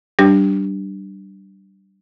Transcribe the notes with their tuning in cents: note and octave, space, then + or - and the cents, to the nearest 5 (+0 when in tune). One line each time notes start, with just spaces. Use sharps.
G3 -20 D4 +0 G4 +0